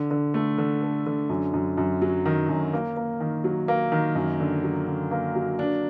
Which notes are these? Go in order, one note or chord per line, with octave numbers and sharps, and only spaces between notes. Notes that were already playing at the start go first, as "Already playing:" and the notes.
Already playing: D3
D3
A3
D3
A4
D3
F#2
F#2
F#2
F#3
D#3
F#2
A#3
A#3
D#3
F#3
A#3
D#3
F#2
D3
F#3
D3
A#3
F#3
D4